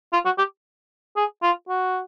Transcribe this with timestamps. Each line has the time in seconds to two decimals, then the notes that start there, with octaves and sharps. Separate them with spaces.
0.13 F4
0.25 F#4
0.38 G4
1.16 G#4
1.43 F4
1.69 F#4